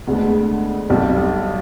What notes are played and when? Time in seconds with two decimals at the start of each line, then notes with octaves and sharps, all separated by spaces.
0.07 D2 D3 G#3 B3
0.90 B1 B2 G3 C4